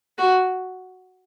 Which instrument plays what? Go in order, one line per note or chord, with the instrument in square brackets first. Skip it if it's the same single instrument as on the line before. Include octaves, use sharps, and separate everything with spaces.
[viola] F#4